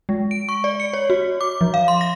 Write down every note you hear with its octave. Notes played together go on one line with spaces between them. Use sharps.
G#3
D7
C#6
D5
C#7
C#5
F#4
D6
F3
F5
C6
A#6